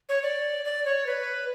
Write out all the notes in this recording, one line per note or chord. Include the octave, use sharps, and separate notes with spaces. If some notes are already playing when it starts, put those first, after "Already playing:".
C#5
D5
D5
C#5
B4